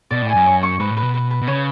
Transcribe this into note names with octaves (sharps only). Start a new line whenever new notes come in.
B2 D5
A2
G#5
F#2
C#5
C#6
G#2 B4
A2
B4
B2
B4
B4
B2
C#3 C#5